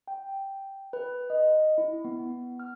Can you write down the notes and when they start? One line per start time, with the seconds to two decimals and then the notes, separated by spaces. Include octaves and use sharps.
0.08 G5
0.93 B4
1.30 D#5
1.78 E4
2.05 B3
2.60 F6